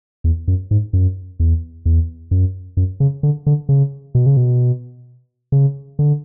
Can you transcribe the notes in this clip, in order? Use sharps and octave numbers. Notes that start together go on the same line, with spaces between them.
E2
F#2
G#2
F#2
E2
E2
F#2
F#2
C#3
D3
D3
C#3
B2
C#3
B2
C#3
D3